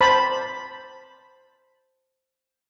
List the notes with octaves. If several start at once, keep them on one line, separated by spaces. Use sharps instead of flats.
C5 A5 B5